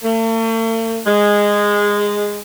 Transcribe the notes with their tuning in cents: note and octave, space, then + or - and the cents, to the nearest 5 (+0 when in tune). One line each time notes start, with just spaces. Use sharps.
A3 +45
G#3 -10